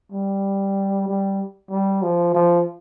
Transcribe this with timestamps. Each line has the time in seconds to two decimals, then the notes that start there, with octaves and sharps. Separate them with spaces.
0.12 G3
1.08 G3
1.71 G3
2.03 F3
2.35 F3